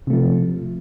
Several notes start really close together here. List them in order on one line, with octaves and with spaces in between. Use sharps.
C3 A3 F3